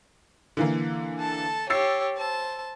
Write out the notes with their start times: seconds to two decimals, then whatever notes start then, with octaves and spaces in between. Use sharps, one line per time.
0.57 D3 E3 A#3
1.20 A4 A5
1.70 G4 C#5 E6 A6 C7
2.17 C5 A5